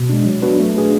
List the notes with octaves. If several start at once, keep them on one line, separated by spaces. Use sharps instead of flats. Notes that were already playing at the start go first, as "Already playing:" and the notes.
Already playing: B2
G#3 D4
F#3
B3 D4 F#4 B4
A3
D4 G#4 B4